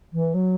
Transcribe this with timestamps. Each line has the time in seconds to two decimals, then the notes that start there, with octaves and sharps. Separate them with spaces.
0.13 E3
0.34 F#3